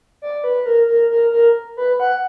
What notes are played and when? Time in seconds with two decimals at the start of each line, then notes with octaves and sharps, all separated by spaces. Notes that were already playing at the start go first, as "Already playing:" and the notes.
0.22 D5
0.44 B4
0.66 A#4
0.88 A#4
1.10 A#4
1.32 A#4
1.77 B4
2.00 F#5